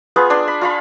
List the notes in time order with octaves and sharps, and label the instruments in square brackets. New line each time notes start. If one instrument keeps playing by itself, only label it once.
[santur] B3 F4 G#4 B4
D4 G#5 C6
B5
F4 F5 B5